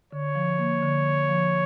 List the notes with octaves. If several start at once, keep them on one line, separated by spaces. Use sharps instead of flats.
D3 C#5
F3
A#3
D3
D3
F3